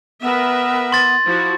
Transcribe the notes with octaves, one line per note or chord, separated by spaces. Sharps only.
B3 A#4 B4 E5
C6 A6
F3 E4 F#4